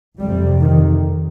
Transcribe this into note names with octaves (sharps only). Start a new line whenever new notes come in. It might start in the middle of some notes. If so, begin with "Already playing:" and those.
F2 C3 G3
D#3